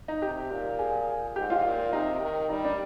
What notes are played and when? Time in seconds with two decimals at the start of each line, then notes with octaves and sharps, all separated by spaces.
0.08 D#4
0.22 C3 G4
0.51 A#2
0.79 G#4
1.36 G#2 G4
1.50 F4
1.65 A#2
1.93 C3 D#4
2.21 D#3
2.50 G3 D#4
2.65 D4